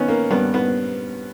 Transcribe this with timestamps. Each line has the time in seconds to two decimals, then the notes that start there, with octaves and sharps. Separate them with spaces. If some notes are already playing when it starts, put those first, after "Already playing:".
Already playing: D#3 B3 C#4
0.08 A#3
0.31 G2 B3
0.54 B3